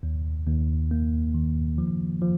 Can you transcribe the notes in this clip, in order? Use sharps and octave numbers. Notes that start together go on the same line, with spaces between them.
D#2
D#2
A#3
D#3
F3
F3